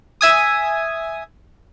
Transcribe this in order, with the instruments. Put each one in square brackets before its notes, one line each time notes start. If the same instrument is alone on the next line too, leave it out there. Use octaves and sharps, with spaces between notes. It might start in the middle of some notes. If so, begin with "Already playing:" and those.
[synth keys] E5 G#5 D#6